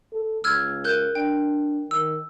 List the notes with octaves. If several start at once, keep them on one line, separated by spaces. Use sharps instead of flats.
A4
C#2 E6 F6 G#6
A#4 F#6 G6
D4 G5
D#3 E6